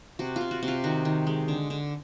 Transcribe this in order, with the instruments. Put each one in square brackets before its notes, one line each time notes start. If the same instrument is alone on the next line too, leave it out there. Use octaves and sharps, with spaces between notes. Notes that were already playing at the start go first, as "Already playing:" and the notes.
[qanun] C3 F#4
C3 F4
F#4
C3
F4
D#3 F#4
D#3
G#3
D3
D3